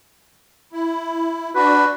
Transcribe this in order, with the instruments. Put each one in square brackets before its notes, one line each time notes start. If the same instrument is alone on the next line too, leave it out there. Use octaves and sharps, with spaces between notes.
[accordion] E4
[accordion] D4 F#4 [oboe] B4